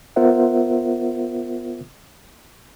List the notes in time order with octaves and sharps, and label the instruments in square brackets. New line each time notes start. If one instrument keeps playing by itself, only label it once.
[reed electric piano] B3 F4 A#4 C5 E5 F#5